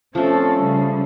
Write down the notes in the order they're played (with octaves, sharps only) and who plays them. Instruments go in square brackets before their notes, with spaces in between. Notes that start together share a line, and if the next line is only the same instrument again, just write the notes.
[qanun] F3 A3 [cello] C4 A4 [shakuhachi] C#4
[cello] C#3 G3